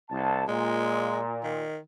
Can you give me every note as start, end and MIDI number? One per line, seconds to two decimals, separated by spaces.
0.10 0.43 36
0.10 0.43 81
0.48 1.64 46
0.48 1.19 56
1.44 1.78 51